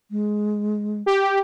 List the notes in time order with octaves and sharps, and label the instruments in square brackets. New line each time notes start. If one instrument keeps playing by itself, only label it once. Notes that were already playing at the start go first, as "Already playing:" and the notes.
[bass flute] G#3
[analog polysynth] G4